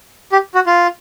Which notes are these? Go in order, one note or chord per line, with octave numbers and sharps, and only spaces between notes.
G4
F#4
F4